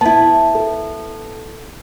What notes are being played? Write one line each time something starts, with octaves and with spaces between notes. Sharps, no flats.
B3 E4 A5
A4